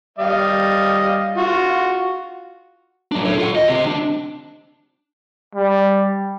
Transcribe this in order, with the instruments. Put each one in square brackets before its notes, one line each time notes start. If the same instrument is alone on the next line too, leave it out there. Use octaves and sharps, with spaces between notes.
[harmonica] G3 D#5 F5
F4 F#4
[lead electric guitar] F#3 D4
A4 C#5
F4 F#5
D#2 D#5
C4 G4
D4
[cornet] G3